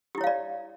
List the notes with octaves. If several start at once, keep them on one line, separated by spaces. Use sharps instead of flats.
E4 G4 C#5 D5 F5